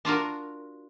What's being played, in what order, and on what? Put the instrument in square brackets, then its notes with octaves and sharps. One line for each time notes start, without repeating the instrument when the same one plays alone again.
[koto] D4 F4 F#4 A#4